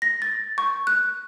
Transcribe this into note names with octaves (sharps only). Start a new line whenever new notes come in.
A#6
A6
C#6
F#6